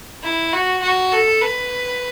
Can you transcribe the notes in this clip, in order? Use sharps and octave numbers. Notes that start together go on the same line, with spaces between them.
E4
F#4
F#4
A4
B4